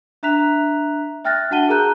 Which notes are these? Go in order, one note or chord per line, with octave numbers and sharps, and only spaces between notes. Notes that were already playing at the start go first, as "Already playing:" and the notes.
D4 E5 A#5 F#6 B6 F7
E5 G5 F6 F#6 A6 A#6
D4 F#4 F#5 A5 D#7 G7
G#4 A#4 A5 A#5 F#6 G6